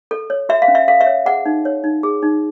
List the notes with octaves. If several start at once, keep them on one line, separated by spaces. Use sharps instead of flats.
A4
C#5
F#4 E5
F5
C#4
E5
A4 F5
E5
C#5
G#4 F#5
D#4
C#5
D#4
G#4
D#4